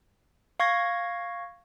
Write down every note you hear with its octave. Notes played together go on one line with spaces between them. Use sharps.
F5 C#6 G#6 A#6